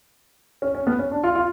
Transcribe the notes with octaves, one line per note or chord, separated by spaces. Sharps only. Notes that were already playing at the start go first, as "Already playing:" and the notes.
C#4
C#4
B3
C#4
D4
F4
F4